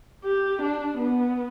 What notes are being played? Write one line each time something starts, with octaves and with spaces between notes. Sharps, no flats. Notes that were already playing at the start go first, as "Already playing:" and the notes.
G4
D4
B3